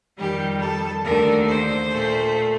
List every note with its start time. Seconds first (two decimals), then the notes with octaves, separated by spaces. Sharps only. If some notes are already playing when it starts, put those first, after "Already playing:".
0.17 F2 D#3 G3 G4
0.60 A4
1.03 D#2 D3 A3 A#4
1.47 C5
1.90 A#2 A3